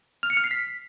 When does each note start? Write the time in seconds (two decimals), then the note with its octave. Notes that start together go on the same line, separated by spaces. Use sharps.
0.23 F6
0.30 C#7
0.37 F6
0.44 C7
0.51 B6